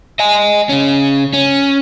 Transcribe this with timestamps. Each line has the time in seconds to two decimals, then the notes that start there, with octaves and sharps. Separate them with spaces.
0.19 D#5 G#5
0.69 C#3 C#4
1.33 C#4